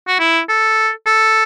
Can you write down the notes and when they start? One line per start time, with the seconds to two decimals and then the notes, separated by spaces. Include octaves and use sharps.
0.08 F#4
0.20 E4
0.49 A4
1.06 A4